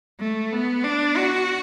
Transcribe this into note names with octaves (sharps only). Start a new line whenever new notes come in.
A3
B3
D4
F#4